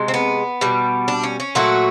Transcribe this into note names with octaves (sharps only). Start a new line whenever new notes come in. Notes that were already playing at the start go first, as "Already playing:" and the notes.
Already playing: C3 G#3
C4
B3
B2 G3
D4
C#4
C#4
A#2 F#3 A3 F#4